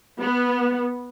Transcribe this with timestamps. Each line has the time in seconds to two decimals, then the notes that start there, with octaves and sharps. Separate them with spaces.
0.20 B3